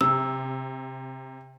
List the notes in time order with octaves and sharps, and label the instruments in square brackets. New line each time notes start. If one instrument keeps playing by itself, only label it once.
[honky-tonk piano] C3 [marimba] E6